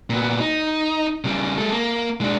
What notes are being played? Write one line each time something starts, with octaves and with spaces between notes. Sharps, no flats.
A#2 B3
D#4
C#3 G3
G#3 A4
A#3
G#3 D4